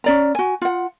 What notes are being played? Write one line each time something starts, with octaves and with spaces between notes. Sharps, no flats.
C#4 D5 A#5
F#4 G#5
F4 F#5